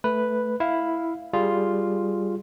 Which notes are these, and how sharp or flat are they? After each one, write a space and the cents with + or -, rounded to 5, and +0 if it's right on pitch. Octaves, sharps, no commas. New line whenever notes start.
A3 +0 B4 +0
E4 +0 F5 +0
G3 +0 F4 +0 G#4 +0